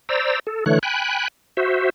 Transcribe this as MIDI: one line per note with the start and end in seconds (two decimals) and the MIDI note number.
0.09 0.39 72
0.09 0.39 74
0.09 0.39 82
0.09 0.39 88
0.47 0.64 69
0.66 0.79 50
0.66 0.79 52
0.66 0.79 57
0.66 0.79 73
0.66 0.79 90
0.83 1.28 79
0.83 1.28 80
0.83 1.28 83
0.83 1.28 90
1.57 1.90 66
1.57 1.90 72
1.57 1.90 76